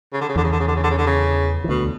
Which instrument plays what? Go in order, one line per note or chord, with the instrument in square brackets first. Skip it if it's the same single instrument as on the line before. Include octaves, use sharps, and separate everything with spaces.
[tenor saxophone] C#3
D3
C#3
[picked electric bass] E2 E3 [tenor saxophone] D3
[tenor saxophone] C#3
D3
C#3
D3
C#3
D3
C#3
D3
C#3
[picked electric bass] E3
[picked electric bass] D2 D3 [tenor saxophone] B2